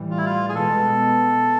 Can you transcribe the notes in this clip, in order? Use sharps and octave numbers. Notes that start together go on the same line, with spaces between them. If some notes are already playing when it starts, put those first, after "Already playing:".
Already playing: A2 E3 G3
F4
E4
F4
G#4
B2 G#3 B3 A4